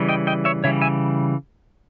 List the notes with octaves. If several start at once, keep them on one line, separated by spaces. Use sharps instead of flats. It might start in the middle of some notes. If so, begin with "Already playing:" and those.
Already playing: C#3 E3 G3
D#5 G5
D#5 G5
C#5 E5
C#3 E3 G3 C#5 E5
E5 G#5